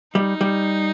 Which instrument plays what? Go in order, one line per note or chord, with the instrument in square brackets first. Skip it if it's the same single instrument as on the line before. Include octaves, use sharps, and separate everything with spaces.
[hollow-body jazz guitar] G3 [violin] D#4
[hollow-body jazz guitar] G3